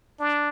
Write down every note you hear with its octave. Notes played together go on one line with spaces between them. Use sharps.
D4